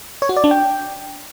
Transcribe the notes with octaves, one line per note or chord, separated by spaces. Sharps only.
C#5
F#4
D5
D4
G5